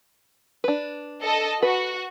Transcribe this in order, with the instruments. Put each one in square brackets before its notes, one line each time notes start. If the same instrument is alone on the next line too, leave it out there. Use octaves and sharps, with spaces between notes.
[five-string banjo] D4 B4
[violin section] A4 D#5
[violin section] F#4 [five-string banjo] B4